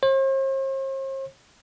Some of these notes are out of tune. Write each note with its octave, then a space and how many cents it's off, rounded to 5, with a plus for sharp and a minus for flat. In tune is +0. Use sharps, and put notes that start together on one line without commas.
C5 +45